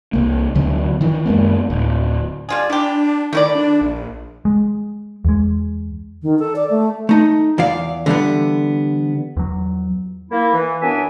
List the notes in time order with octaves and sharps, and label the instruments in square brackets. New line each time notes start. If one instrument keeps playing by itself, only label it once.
[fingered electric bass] C2 A#3
D2 D3 F#3 B3
D#3 E3
F#2 G#3 A#3 B3
D1
[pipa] G3 F4 G#4
[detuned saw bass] D4 [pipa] E4 G4
[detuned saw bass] D#3 [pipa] A3 E4 D5
[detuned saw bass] D4
A#1
[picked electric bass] G#3
E2 G#3
[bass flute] D#3
A4
D5
A3
[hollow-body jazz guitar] A3 D#4
E2 E3 D5 F5
D3 E3 G3 B3
[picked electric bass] E2 F#3
[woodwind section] A#3 E4
E3
F#2 E3 B3 D4 E5 G#5